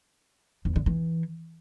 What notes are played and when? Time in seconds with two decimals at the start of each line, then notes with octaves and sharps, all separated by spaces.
0.65 E2
0.76 D3
0.86 E3